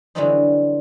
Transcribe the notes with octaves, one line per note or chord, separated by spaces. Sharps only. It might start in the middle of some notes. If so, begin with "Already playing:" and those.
D3 E3 F#3 G3 C4 D#4